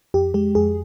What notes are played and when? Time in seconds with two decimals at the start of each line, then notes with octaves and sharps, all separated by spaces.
0.14 F2 G4
0.34 G#3 G4
0.55 F2 G#4